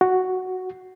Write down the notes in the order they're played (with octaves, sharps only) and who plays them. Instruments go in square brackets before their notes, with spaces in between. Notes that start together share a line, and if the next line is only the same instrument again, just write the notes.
[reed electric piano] F#4